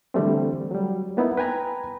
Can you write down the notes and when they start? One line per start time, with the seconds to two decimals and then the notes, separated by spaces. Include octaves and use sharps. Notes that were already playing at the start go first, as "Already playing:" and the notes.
0.14 D3 E3 G3 A3 C4
0.71 F#3 G3
1.17 A#3 B3 D#4 E4
1.37 B4 G5 G#5 A#5 B5